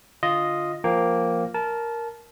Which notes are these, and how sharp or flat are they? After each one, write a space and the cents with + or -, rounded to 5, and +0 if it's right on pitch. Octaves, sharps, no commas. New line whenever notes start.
D3 +0 F4 +0 D#5 +0
F3 +0 A#3 +0 G5 +0
A#4 +0 A5 -20